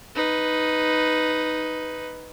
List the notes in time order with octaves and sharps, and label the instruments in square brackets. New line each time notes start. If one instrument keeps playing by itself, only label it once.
[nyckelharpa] D#4 B4